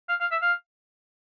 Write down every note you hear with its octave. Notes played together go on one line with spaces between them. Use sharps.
F5
F5
E5
F5